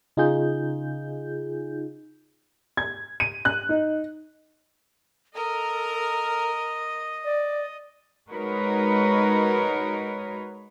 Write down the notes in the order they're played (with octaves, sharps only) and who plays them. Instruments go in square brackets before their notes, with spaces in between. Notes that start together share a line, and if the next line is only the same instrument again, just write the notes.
[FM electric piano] C#3 D#4 F4 G#4 G6
[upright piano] G#6
D#7
F#6
D#4
[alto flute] A4 [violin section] A#4 [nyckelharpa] D#5
[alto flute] D5
[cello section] G#3 D#4 F#4 A#4 B4 C#5